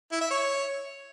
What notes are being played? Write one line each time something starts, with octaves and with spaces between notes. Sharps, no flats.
E4
E5
C#5